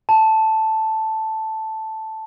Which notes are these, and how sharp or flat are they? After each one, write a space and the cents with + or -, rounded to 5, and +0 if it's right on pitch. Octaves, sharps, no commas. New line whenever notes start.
A5 +0